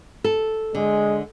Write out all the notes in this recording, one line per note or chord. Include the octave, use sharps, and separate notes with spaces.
A4
D3 G#3